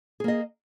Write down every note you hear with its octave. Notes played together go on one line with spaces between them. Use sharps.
A#3 G#4 D#5